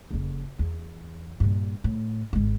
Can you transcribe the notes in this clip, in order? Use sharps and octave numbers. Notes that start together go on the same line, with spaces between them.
F#1 F2
E2
G2 A#2
A2
G#1 G#3